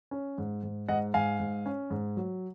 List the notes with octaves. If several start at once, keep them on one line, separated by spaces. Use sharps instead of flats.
C#4
G#2
G#2
G#2 D#5 F#5
G#2 F5 G#5
G#2
C#4
G#2
F#3